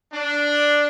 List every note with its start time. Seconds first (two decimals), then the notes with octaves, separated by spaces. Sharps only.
0.13 D4